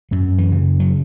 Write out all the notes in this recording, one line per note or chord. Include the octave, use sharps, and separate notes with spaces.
F#2 F#3
E3
C#3
F#3